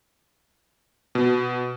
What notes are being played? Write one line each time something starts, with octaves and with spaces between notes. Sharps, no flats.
B2